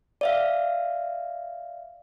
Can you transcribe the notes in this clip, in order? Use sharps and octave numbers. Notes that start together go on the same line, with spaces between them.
D5 E5 F5